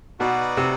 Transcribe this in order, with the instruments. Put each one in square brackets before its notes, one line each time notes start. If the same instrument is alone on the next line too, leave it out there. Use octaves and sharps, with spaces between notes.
[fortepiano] B2 [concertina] D#4 F#4 B4 D5 F#5
[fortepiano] C3